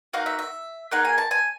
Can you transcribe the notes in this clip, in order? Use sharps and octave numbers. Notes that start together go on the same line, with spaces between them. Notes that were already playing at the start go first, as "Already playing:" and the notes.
A#3 D#4 F#4 F5
E5
E5
A#3 D#4 G#4 F#5
G#5
A5
G#5